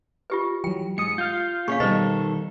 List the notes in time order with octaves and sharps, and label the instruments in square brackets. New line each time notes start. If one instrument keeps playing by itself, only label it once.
[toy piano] F4 G4 B4
[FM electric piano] E3 F#3 [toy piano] G5
[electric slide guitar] G#2 [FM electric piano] D#6 C#7
[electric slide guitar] F4 [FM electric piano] F6 G6
[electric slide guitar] A#2 C#4 [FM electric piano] G#4 [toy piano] F5 C#6
[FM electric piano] B2 G3 [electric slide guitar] D#3 A4 [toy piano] B4 C5 D#5